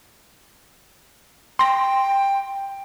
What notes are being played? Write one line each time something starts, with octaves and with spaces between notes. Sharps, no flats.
G5 C6 A#6